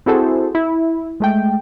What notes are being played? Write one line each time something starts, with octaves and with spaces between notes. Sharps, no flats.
C4 E4 F#4 G#4 A4 C5
E4
G#3 A3 G5